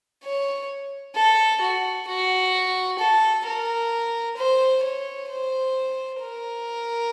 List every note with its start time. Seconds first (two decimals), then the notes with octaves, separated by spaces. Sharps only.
0.24 C#5
1.16 A4
1.61 F#4
2.08 F#4
2.99 A4
3.46 A#4
4.37 C5
4.84 C#5
5.29 C5
6.21 A#4